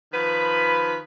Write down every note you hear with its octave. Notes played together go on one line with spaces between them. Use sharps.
D#3 F3 B4 B5